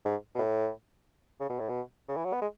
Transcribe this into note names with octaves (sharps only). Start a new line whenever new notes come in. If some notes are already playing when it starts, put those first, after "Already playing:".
G#2
B2
A2
C#3
B2
A2
B2
C#3
E3
F#3
B3
G#3